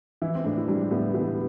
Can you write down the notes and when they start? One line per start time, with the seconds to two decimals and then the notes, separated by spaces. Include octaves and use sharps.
0.22 E3 E4
0.35 C4
0.44 A2 D4
0.58 E4
0.68 G3 D4
0.91 A2 B3
1.14 E3 B3